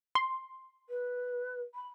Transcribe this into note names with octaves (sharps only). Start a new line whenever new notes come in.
C6
B4
B5